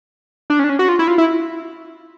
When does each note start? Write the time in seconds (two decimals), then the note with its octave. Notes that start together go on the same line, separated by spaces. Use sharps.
0.50 D4
0.59 C#4
0.64 D4
0.69 C#4
0.79 F#4
0.89 F4
0.99 E4
1.08 F4
1.18 E4